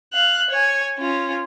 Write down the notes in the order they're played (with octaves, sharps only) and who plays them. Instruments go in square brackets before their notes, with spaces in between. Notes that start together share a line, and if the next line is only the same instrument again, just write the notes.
[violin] F5 F#6
C#5 G#5
C#4 F4